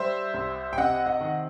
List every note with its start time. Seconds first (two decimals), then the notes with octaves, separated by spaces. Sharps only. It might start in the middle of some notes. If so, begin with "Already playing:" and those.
Already playing: G3 C5 E5
0.34 C2
0.73 G5
0.78 C3 D#5 F#5
1.06 D#5 F#5
1.21 D#3